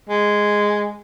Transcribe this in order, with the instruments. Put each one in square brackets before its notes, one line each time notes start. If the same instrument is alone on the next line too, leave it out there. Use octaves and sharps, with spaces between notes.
[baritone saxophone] G#3